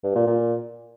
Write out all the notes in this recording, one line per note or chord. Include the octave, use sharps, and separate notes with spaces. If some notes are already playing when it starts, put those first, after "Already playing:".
G2
A#2
A#2